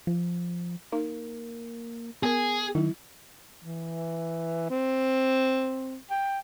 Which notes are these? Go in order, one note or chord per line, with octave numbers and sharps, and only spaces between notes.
F3
A#3 D#4
B3 G#4 A#4
D#3 F#3 E4
E3
C4
G5